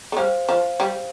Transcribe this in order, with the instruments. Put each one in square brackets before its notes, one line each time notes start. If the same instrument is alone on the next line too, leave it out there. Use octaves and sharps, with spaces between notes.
[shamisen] A3
[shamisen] G3 [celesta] C5 F5
[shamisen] F3 [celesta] C5 F5
[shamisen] G3